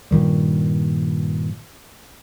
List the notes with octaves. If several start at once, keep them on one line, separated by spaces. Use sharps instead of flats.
G2 A#2 D#3 G3